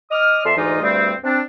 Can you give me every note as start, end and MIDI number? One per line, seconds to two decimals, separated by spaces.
0.11 0.41 75
0.11 0.41 86
0.11 0.41 87
0.11 0.41 89
0.45 0.55 41
0.45 0.55 69
0.45 0.55 74
0.45 0.55 76
0.45 0.55 84
0.57 0.82 38
0.57 0.82 44
0.57 0.82 52
0.57 0.82 63
0.57 0.82 65
0.57 0.82 75
0.82 1.13 38
0.82 1.13 43
0.82 1.13 55
0.82 1.13 57
0.82 1.13 60
1.23 1.41 60
1.23 1.41 62